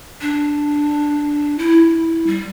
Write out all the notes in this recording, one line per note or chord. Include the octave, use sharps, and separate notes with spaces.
D4
E4
G3